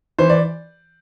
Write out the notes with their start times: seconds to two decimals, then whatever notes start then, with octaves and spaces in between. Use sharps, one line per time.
0.19 E3 C5
0.30 D5